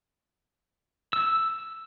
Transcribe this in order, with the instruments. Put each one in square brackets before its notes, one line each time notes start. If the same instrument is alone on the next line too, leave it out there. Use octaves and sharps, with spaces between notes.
[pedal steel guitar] E6